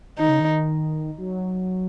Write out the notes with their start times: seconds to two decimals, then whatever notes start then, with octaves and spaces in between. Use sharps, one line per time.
0.18 D#3 D#4
0.29 C#3
0.40 D#3
1.18 F#3